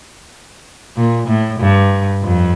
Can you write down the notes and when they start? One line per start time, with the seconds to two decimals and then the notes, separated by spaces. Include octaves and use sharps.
0.97 A#2
1.28 A2
1.60 G2
2.23 F2